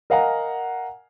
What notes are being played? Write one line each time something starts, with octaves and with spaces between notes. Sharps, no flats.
A#4 D#5 F5 F#5 G#5 A#5